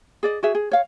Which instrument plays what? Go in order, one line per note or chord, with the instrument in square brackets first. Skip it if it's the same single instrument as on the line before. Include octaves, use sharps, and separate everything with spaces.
[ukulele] G#4 D5 D#5
F#4 G#4 E5
G#4
C#5 F5